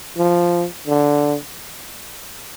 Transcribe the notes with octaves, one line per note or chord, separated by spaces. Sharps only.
F3
D3